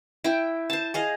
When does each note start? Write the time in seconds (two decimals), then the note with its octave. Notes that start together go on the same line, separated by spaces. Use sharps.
0.24 E4 G5
0.70 C5 A5
0.94 G#4 D#5 F5